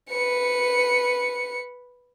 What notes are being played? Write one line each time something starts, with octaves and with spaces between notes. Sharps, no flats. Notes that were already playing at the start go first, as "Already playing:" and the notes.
B4 C#7